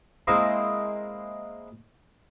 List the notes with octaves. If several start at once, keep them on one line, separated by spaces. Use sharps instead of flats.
G#3 A#3 C4 E4 D#5